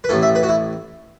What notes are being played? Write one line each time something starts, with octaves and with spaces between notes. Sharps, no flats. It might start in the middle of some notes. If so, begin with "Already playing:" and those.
B4
A1 A2 E3 A4
E5
B4
F#4
E4